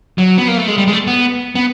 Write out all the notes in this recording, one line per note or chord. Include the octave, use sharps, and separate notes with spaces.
F#3
B3
A#3
A3
G#3
G3
G#3
A3
B3
B3